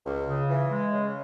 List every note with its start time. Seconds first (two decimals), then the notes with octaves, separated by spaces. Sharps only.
0.06 C#2
0.28 C#3
0.49 E3
0.71 G#3
0.93 C#3